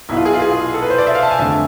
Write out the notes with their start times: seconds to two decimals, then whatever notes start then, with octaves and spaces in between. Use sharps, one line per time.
0.09 B1 B2 B3 E4
0.17 F4
0.25 G#4
0.33 F4
0.42 G#4
0.74 A4
0.82 B4
0.90 C5
0.98 D5
1.07 E5
1.14 F5
1.23 A5
1.31 G#5
1.39 F2 D3 A3 E5